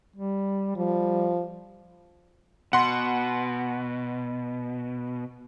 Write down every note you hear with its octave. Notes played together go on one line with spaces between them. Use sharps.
G3
F3 G3
B2 F#5 C6